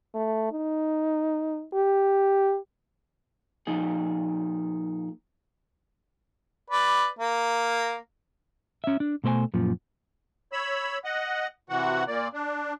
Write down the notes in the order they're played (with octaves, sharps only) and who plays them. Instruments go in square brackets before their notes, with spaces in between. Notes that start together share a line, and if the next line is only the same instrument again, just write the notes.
[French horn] A3
D#4
G4
[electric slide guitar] A#2 F3 D#4 G#4
[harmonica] B4 D5
A#3
[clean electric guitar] C#4 E5
D4
B2 A3 C5 D5 G#5
F#2 A#2 F3
[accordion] C#5 B5 E6
D#5 F#5
C3 E3 F#4 F#5
A#2 A#3 D5
D4